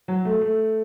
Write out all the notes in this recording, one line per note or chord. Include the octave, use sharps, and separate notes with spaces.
F#3
A3
A3